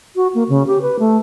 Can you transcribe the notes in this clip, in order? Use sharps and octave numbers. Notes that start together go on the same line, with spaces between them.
F#4
A#3
C#3
G4
B4
A3